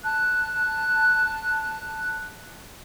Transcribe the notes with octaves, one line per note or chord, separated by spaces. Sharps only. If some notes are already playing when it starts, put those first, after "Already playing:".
A5 F#6